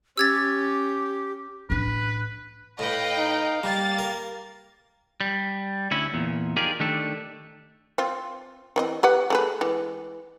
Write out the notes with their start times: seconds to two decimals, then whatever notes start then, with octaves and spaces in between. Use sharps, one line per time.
0.17 C#4 G4 E6 G#6 A6
1.70 A1 D4 B4
2.79 A2 B4 D#5 F5 G5
3.17 D#4
3.63 G3 A#3 G4 A6
3.99 A#4
5.21 G3
5.91 D2 C#4 E4
6.14 E2 A#2
6.56 D#4 F4 G4 G#4 A#4 D5
6.80 D#3 A3 D4 G4 A4
7.98 C4 F4
8.76 E3 C4 D#5
9.03 G4 B4 F#5
9.30 A3 G#4 B4
9.61 E3 G#3